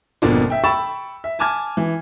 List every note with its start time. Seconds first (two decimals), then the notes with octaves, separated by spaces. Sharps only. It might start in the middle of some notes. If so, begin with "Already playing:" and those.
0.22 G#1 F2 B2 A#3 D4 F4
0.50 E5 G5
0.64 G5 B5 C#6 E6 A6 E7
1.24 E5
1.39 G#5 A5 D6 F6 G#6
1.77 E3